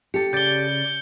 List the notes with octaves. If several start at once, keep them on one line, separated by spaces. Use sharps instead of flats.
G4 A4 C#7
C#3 D5 G6 G7